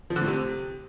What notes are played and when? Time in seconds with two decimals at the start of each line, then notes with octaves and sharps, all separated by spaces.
0.10 F3
0.16 D3
0.22 A2
0.27 C3